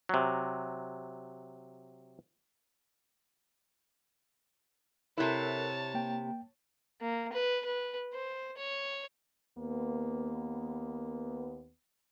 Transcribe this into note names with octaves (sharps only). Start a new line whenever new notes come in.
C3 F#3
C3 E4 A4 A#4 C#5 A5 F#6
A#3 G5
A#3
B4
B4
C5
C#5
D#2 A#3 B3